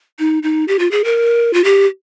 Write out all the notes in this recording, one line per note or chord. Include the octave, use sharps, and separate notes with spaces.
D#4
D#4
G4
F4
G#4
A#4
F4
G4